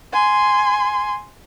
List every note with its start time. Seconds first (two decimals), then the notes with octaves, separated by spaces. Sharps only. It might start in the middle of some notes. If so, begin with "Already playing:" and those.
0.13 G#5 C6